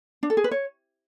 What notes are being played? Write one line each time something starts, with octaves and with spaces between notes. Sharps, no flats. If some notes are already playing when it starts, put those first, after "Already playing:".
D4
A4
G#4
B4
C#5